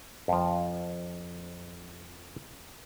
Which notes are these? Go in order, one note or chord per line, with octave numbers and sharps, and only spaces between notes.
F2 F3